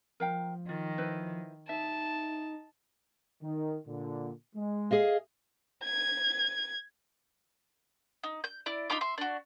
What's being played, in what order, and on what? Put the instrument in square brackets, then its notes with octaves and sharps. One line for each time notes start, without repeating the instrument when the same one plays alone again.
[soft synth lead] F3 [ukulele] A#4 F5 G5
[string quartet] D#3 [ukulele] F4
[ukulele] E4 B4 C5
[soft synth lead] D#4 [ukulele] E5 [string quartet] A5
[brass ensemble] D#3
A#2 D3
G#3
[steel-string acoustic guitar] G#4 D#5 F5
[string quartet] G#6
[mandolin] D#4
G6
E4 D5
D#4 F4 B5 D6
E5 C6
D4 F#4